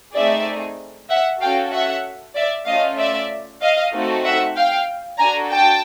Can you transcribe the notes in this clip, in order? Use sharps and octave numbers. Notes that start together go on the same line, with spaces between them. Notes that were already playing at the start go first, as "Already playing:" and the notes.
A3 C4 D#4 G#4 D5 E5
E5 F#5
C#4 F#4 A4 F5 G5
E5 F#5
D5 E5
A3 C#4 F4 D#5 F5
D5 E5
D#5 F5
A3 C4 D#4 F#4 A4
E5 F#5
F5 G5
D4 F#4 A4 G#5 A#5
G5 A5